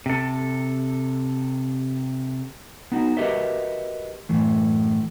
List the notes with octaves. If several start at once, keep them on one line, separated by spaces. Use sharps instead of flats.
C3 A4
B3 D#4 F#4
F#4 G4 A#4 B4 D#5 E5
F#2 A2 E3 A3